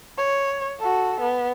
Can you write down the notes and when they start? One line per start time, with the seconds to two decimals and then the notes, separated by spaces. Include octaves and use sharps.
0.18 C#5
0.79 F#4 A4
1.21 B3